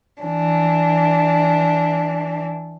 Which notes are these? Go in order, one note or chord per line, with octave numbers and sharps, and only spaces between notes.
E3 D4